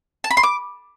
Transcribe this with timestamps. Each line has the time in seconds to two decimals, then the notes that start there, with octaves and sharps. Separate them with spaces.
0.24 A5
0.31 B5
0.37 C6
0.43 D6